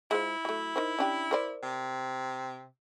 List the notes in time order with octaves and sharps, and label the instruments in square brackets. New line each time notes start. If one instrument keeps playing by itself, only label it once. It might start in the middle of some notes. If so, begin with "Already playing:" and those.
[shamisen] G#3 F4 C5 [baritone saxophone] E4
[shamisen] F#3 A3
D#4 A#4 C5
C#4 D4 G4
A#4 C5 D5
[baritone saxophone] C3